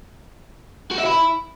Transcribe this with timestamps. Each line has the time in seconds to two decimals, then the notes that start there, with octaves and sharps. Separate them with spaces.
0.91 F#4
0.98 E5
1.05 E4